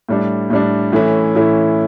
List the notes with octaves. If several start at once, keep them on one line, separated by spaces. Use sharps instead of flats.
A2 G3 D4
A2 G3 D4
A2 E3 A3 C#4 E4
A2 E3 A3 C#4 E4